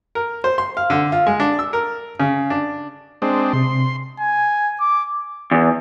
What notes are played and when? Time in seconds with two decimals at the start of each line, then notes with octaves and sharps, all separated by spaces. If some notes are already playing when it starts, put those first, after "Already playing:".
0.15 A#4
0.44 C5
0.58 C6
0.77 F5
0.90 D3
1.12 F4
1.27 G#3
1.40 D4
1.59 E6
1.73 A#4
2.20 C#3
2.50 D4
3.22 G#3 C4 D4
3.53 C3 C6
4.20 G#5
4.81 D6
5.51 E2